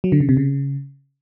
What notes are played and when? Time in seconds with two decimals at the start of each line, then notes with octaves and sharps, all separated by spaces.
0.04 F#3
0.12 D3
0.20 C#3
0.29 C3
0.37 C#3